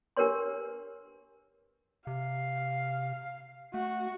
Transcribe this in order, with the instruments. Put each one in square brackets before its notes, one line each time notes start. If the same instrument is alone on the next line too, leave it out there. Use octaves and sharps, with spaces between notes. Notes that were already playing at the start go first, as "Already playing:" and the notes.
[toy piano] D4 G4 A#4 B4 C#5 C6
[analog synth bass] C3 [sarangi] F5
[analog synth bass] A3 [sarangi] F#4